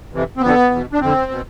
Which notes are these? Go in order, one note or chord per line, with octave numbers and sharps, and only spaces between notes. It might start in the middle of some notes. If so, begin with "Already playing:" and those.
F2 C3 E3
C4
F2 D3 B3
E2 B2
D4
F2 D3 C4
B2